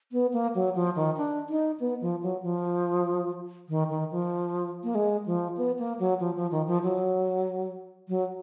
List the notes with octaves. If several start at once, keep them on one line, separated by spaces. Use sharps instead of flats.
B3
A#3
F#3
F3
D#3
D4
D#4
B3
F3
F#3
F3
D#3
D#3
F3
A#3
G#3
F3
B3
A#3
F#3
F3
F3
D#3
F3
F#3
F#3